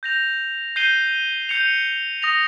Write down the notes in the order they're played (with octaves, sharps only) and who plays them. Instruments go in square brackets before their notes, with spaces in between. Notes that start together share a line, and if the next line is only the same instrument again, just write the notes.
[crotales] G6 A#6 F7
G6 C7 D#7 G7
G6 C#7 F7
D#6 A#6 F7